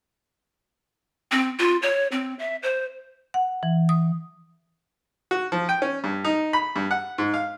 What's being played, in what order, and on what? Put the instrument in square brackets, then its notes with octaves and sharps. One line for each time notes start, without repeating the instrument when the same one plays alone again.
[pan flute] C4
F4
C#5
C4
E5
C5
[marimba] F#5
E3
D#6
[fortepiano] F#4
F3
G5
C#4
G2
D#4
B5
G2
F#5
G#2
F5